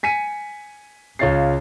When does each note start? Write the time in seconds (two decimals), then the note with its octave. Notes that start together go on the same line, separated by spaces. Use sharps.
0.03 G#5 B6 C#7 D#7
1.19 C#2 F4 C#5 F5 A6 C7